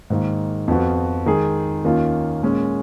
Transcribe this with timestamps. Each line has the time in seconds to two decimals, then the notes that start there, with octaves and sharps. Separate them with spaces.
0.10 G#2 D#3 A#3
0.68 F2 F3 B3 F#4
1.26 D#3 G#3 D#4 G#4
1.84 D#2 D#3 A#3 C#4 F4
2.42 A#2 G#3 C#4